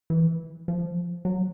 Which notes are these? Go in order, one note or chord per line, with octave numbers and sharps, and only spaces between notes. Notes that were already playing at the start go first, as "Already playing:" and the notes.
E3
F3
F#3